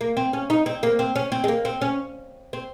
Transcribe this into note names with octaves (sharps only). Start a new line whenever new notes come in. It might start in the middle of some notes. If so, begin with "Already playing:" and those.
A#3
C4
C#4
D#4
C4
A#3
C4
C#4
C4
G#3
A#3
C4
C#4
C4